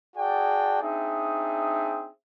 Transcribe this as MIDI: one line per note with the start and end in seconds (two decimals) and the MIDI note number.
0.17 0.79 66
0.17 0.79 68
0.17 0.79 74
0.17 0.79 79
0.17 0.79 81
0.83 2.10 60
0.83 2.10 62
0.83 2.10 63
0.83 2.10 68
0.83 2.10 76